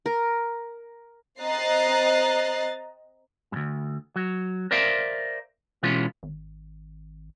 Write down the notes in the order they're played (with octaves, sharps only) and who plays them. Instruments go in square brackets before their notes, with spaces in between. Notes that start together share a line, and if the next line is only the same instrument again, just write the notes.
[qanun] A#4
[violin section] C4 D#5 A#5 F#6 A6 C7
[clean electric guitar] D2 G2
F#3
A#4 C5 D5 E5 F5
B2 E3 G#3 C#4 F4
[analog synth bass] G#1